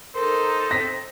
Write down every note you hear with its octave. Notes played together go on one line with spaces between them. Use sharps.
D#4 A4 A#4 C5
C4 A#6 B6